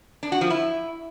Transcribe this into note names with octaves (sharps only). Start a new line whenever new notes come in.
D4
F#4
F3
E4